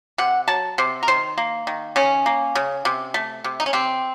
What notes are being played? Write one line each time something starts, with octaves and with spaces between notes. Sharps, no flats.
C3 F#5
F#3 A5
C3 C5
A#4
D#3 C5
A#3
D#3
C#3 C#4
A#3
C#3
C3
A3
C3
D#4
C#4
C3 C4